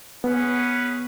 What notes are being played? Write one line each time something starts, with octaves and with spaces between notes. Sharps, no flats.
B3 C#4 G#4 B4 F#5